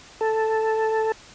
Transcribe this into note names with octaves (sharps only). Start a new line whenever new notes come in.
A4